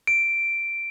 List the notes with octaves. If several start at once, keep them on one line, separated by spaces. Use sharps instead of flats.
D7